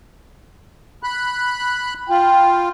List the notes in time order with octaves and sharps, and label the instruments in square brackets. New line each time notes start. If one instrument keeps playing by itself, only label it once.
[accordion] B5 F#6
[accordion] F4 [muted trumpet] G5